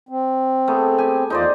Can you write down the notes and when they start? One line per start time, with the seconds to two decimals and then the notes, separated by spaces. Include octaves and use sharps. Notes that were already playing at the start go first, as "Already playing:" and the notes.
0.09 C4
0.68 A3 B3 G#4
0.98 G4 G#5
1.30 E2 D#4 F4 C5 D5